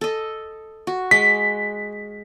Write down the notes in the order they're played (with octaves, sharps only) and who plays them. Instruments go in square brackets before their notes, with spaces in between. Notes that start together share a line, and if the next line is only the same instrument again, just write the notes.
[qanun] A4 D#5
F#4
[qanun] G#3 [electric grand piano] B6